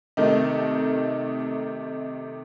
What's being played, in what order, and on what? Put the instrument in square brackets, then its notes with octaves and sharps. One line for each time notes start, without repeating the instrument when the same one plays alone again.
[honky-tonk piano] C3 D#3 A3 D#4